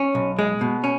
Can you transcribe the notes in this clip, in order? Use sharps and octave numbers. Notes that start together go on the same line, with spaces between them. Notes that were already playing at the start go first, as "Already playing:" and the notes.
Already playing: C#4
B1
G#3
B2
C#4